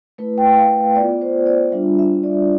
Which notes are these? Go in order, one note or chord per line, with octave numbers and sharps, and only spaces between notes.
A3 E4 B4
G5
F5
B3 F4 D5
C5
D5
G3 D4 F4 E5
E5
D5